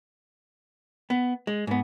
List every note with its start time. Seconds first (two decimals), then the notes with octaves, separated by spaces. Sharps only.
1.10 B3
1.47 G#3
1.67 G#2 B3